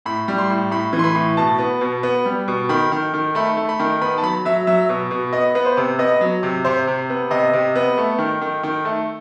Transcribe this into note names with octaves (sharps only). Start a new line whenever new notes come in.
A2 B5
G3
C6
A2
A2 B5
E3
C6
B5
A2
B2 A5
B3
B2
B3
G3
B2
D#3 B5
D#3
D#3
A3 B5
A3
B5
D#3
B3 B5
A5
F#3 B5
F#3 E5
F#3 E5
B2
B2
B3 D#5
B3 B4
C5
C3
B3 D#5
F#3
C3
C3 C5
C3
B3
C3 D#5
C3
B3
A3
D#3
D#3
D#3
A3